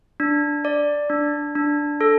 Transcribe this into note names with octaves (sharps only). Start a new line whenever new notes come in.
D4
D5
D4
D4
A4